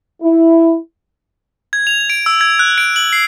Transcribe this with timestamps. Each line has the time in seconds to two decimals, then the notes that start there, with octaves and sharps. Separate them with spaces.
0.22 E4
1.73 G#6
1.87 F7
2.10 D7
2.26 E6
2.41 G#6
2.59 F#6
2.78 D7
2.96 F#7
3.13 C7